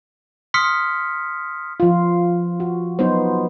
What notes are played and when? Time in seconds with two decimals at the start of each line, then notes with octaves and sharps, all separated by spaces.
0.54 C6 D#6 F6 B6 C#7
1.80 F3 F4
2.60 F#4
2.99 F#3 B3 D#4 C5